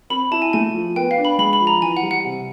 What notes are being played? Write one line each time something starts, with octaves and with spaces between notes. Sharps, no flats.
C4 B5
E4 A5
G#5
A3 G#5
F3
B3 G5
F5
D4
B5
G#3 B5
B5
F3
A#5
E3 G#5
F#5
G3
F#5
C3